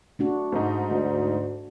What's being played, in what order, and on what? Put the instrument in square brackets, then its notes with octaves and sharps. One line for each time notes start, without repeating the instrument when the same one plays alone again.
[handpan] A3 D4 F#4
[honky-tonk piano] G#2 D#4
[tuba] D2